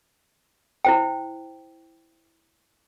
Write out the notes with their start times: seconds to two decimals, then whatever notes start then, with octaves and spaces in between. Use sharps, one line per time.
0.85 E4 C5 G5